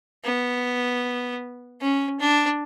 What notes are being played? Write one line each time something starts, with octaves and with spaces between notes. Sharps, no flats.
B3
C#4
D4